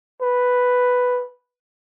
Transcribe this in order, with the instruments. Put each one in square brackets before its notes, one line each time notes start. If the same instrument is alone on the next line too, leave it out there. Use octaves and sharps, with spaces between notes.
[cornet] B4